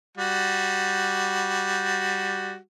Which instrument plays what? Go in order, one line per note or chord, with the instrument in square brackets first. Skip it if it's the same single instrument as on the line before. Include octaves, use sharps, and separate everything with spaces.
[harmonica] G3 F#4